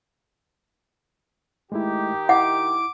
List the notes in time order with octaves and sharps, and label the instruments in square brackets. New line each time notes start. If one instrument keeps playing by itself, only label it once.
[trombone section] D#3 D#4 G4 [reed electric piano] G#3 A3 E4
[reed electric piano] E4 [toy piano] F#5 [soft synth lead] D6